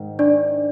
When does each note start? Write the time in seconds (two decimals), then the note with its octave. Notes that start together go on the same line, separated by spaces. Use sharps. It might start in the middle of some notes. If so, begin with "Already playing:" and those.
Already playing: G#2 D#3
0.19 D4 D5